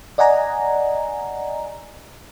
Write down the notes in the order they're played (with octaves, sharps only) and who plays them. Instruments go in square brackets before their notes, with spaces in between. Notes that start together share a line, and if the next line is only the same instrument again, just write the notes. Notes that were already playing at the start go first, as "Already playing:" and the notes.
[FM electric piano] D5 D#5 F#5 G#5 A#5